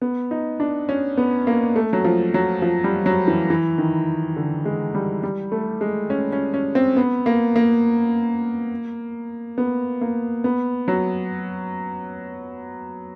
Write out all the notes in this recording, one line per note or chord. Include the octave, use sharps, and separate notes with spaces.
B3
D#4
D4
C#4
B3
A#3
A3
F#3
F3
F#3
F3
G3
F#3
E3
E3
D#3
D3
G#3
G3
G3
A3
G#3
C#4
C#4
C#4
C4
B3
A#3
A#3
B3
A#3
B3
F#3